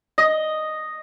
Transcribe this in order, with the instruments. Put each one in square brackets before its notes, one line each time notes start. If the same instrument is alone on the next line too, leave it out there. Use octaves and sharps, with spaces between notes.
[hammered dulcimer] D#5